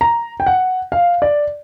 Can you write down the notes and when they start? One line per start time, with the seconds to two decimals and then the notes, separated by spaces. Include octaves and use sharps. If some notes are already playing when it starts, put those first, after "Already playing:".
0.01 A#5
0.40 G5
0.46 F#5
0.92 F5
1.22 D5